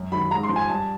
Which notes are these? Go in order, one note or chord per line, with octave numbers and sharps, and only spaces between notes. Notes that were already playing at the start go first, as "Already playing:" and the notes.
Already playing: F#2
D#3 F#3 B5
G#2 A#5
C6
F3
G#5
G2 A5